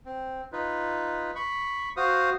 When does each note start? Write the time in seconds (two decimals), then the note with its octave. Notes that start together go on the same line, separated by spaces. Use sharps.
0.06 C4
0.52 D#4 F4 B4
1.35 B5 C#6
1.97 F#4 C5 F5 D#6